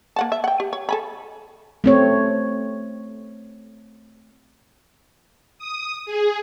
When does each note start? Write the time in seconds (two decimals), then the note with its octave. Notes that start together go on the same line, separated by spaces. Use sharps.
0.16 A#3 F#5 A5
0.32 E5
0.44 F#5 G5
0.60 G4
0.73 C#5
0.89 A4 G#5 B5
1.84 A3 C4 C#5
5.58 D#6
6.06 G#4